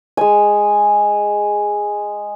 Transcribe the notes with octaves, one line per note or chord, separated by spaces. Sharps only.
G#3 G#5